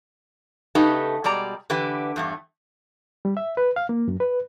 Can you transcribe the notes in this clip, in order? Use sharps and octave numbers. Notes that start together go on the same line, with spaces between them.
C#3 A3 D#4 G4 A4 B4
B2 G3 G#3 D5 A#5
D3 E3 E4 G4 B4
E2 G2 A3
G3
E5
B4
F5
A#3
F#2
B4